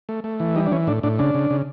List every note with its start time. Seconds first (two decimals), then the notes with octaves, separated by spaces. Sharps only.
0.09 A3
0.24 A3
0.40 E3
0.56 G3 D#4
0.66 D4
0.71 E3 C#4
0.87 A2 D4
1.03 A2 D4
1.19 C#3 D4
1.35 C#3
1.50 C#3